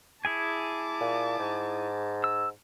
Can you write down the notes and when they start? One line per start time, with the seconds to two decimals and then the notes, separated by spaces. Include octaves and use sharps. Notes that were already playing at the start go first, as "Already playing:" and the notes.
0.25 E4 G#4 G#5 A5 D6
1.01 A#2
1.39 G#2
2.24 E6